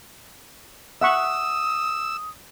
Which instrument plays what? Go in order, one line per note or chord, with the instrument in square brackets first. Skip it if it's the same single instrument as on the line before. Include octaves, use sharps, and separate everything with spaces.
[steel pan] E5 F#5 C#6 [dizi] D#6 [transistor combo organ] E6